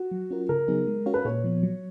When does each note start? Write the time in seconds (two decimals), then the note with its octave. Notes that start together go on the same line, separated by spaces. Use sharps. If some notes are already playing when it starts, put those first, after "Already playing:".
Already playing: F#4
0.12 F#3
0.31 C#4 F4 A#4
0.49 C#3 A#4
0.68 F#3 B3 D#4 G#4
0.87 G#3
1.06 C#4 F#4 C#5 F5
1.14 B4
1.25 A#2 C#5
1.44 F3 B3
1.63 F#3